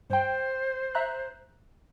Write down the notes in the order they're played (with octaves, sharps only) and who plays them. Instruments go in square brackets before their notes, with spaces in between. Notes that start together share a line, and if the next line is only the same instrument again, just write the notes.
[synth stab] G2 G5 [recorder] C5
[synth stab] E5 A#5 F#6